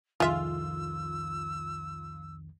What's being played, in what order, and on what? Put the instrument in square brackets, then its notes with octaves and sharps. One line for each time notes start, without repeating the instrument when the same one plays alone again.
[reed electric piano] C2 F2 D#3 [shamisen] G#3 E5 [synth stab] F4 [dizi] E6